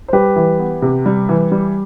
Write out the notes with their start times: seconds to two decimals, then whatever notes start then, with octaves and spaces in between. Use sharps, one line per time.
0.08 C5
0.13 G3 G4 B4
0.36 E3
0.60 B3
0.82 C3
1.06 G3
1.29 E3
1.52 G3